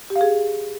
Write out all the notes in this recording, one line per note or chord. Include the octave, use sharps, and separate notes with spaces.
G4
F5
G#4